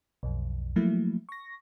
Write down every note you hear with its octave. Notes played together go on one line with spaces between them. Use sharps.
B1 F2
F3 F#3 A3 A#3 E4
C#6 A#6